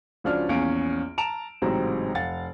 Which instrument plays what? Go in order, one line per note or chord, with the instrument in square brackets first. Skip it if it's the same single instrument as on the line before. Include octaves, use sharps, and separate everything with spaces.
[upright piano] C#2 F3 C#4 D4 F#4 F6
A#1 E2 C#4 F5 D7
A5 A#5 D7 E7 F7
A1 G#2 C3 F#3 C4 A#5
F1 F5 F#5 A6